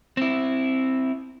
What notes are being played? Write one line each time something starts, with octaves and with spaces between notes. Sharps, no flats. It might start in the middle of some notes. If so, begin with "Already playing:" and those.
C4 E4